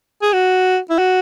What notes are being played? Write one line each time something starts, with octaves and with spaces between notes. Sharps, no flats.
G#4
F#4
E4
F#4